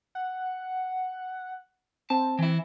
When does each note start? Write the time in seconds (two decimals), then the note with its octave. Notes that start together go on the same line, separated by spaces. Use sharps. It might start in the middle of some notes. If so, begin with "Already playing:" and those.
0.15 F#5
2.10 C4 A5
2.39 E3 E4